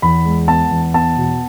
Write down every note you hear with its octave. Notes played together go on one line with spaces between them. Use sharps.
E2 B5
G#3
B3 A5
E2
B3 A5
B2